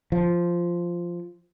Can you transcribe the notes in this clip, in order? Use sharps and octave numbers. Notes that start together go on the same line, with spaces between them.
F3